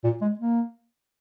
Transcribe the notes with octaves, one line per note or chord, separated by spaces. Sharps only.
A#2
G#3
A#3